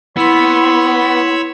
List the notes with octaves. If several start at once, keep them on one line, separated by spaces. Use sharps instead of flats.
B3 E4 C#5 B5 C6 E6